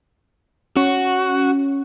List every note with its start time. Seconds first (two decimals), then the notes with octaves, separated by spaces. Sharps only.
0.77 C#4 F#4